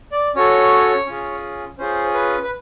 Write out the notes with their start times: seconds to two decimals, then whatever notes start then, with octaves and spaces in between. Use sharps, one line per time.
0.12 D5
0.35 C#4 F#4 A4 C#5
1.07 C#4 F4 G#4
1.78 C#4 F4 G#4 C5
2.14 B4
2.43 B4